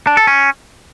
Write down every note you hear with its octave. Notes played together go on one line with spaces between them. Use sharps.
D4
A4
C#4